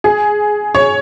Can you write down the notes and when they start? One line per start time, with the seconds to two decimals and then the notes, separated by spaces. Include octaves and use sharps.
0.04 G#4
0.75 C#5